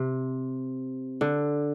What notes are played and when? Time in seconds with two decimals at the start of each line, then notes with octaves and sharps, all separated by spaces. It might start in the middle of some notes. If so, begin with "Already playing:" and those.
Already playing: C3
1.21 D3